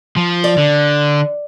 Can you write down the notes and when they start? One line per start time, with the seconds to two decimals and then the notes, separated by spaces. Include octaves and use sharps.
0.17 F3
0.44 D5
0.58 D3